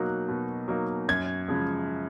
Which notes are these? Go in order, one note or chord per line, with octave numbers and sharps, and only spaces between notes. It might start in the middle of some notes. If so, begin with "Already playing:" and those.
Already playing: B2 F#3 A#3 D#4 F#6
B2
F#3 A#3 D#4
F#2 G#6
C#3 F3 G#3